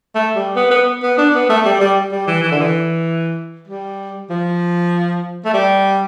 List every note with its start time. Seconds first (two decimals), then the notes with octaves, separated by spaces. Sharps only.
0.15 A3
0.35 G3
0.56 B3
0.71 B3
1.03 B3
1.18 D4
1.34 B3
1.49 A3
1.65 G3
1.80 G3
2.12 G3
2.27 E3
2.43 E3
2.52 D3
2.61 E3
3.67 G3
4.30 F3
5.45 A3
5.54 G3